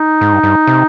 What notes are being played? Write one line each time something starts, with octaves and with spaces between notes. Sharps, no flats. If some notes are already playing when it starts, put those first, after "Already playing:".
Already playing: D#4
G#2
G2
G2
C3